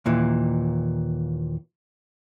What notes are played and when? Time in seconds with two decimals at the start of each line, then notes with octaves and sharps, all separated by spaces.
0.06 D#2 A#2 E3